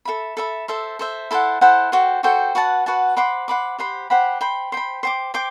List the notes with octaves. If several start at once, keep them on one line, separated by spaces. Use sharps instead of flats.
A4 E5 B5
A4 E5 B5
A4 C5 E5
A4 C5 E5
E4 A4 C5 F#5
E4 A4 C5 F#5
F#4 A4 C5 G5
F#4 A4 C5 G5
F#4 B4 F#5 A5
F#4 B4 F#5 A5
C5 F#5 B5 D6
C5 F#5 B5 D6
G4 C5 F#5 B5
G4 C5 F#5 B5
C5 G5 B5
C5 G5 B5
C5 G5 D6
C5 G5 D6